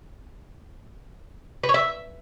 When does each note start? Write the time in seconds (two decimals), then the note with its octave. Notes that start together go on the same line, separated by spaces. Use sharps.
1.63 B4
1.69 C#5
1.74 E5